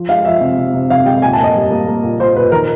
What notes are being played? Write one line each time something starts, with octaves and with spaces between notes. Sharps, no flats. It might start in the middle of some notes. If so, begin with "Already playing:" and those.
Already playing: F3
G#3 F5
F3 E5
C3
C3
C3
C3 F5
G#3 G5
A#2 G#5
A5
A#3 D#5
G3
A#3
A#3
A#2
A#2 C5
A#2 B4
D#3 A#4